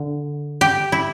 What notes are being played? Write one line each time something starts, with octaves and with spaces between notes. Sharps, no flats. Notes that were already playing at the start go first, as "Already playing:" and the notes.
Already playing: D3
G4
E4